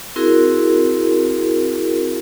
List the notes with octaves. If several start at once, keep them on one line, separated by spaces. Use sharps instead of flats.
C4 E4 F#4 G#4 A#4